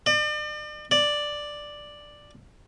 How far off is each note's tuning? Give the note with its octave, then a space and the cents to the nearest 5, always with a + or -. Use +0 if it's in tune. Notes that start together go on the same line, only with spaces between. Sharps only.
D5 +40
D5 +5